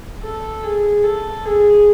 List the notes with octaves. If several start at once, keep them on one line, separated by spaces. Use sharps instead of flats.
A4
G#4
A4
G#4